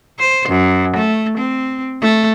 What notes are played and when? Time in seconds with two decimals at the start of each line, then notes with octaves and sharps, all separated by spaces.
0.19 C5
0.49 F#2
0.97 A3
1.38 C4
2.02 A3